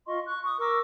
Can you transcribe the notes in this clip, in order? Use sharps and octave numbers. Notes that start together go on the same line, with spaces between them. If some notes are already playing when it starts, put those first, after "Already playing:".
F4 D#5 C6 C#6
C#6 F#6
C#6 D#6
A#4 C#6 D6 E6